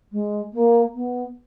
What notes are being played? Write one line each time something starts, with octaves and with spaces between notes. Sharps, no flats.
G#3
A#3
B3